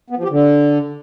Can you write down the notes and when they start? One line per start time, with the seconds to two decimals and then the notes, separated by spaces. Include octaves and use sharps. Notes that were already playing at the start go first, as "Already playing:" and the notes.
0.10 B3
0.17 F3
0.24 G4
0.30 D3